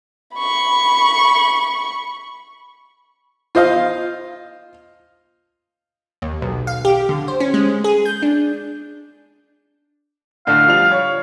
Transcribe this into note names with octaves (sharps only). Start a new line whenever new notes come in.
B5 C#6
F4 C5 D#5 F5
D#2
B1
F5
G4
D3
C5
C#4
G#3
G#4
G6
D4
A2 D3 A3 F5
F3 G3 F7
C#5